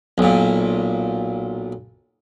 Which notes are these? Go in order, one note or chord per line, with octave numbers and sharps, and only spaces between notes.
B1 A#2